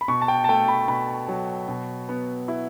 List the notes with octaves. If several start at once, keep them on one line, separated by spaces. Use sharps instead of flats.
B5
B2 C#6
A5
G5
A5
A3 G5
B5
B2 B5
F#3
B2
B3
E4